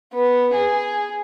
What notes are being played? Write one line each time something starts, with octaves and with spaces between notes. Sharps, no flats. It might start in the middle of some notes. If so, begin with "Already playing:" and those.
B3
G#4